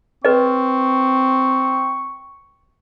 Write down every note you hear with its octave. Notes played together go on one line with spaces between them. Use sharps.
C4 B4 D#5 C#6